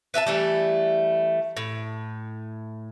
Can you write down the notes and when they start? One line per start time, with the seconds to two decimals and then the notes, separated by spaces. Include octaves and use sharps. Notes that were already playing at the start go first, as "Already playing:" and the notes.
0.14 B4 E5 F5 A5
0.27 E3 G3 A3
1.57 A2